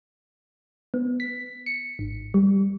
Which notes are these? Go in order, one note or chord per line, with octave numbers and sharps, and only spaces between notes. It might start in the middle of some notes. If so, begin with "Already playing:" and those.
B3
B6
C#7
G#1
G3